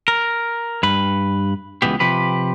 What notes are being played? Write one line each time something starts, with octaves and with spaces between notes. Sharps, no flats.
A#4
G2 B4
C#2 G#2 E3 B3 G4
C3 F3 G4 B4